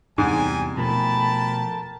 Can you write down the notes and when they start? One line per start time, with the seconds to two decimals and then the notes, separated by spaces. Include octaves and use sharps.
0.18 E2 G#2 C3 G3 G#5
0.77 B2 F3 A3 A#4 G5 A5 B5